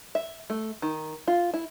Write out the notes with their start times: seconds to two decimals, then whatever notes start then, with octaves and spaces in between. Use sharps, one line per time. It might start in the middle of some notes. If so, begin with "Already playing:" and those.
0.15 E5
0.50 A3
0.82 D#3
1.28 F4
1.54 E4